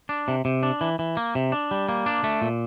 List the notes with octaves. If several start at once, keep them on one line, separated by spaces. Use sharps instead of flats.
D4
C3
C3
D4
E3
E3
A#3
C3
D4
G3
A#3
D4
A3
A#2